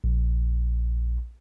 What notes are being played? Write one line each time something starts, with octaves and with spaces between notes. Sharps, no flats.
A#1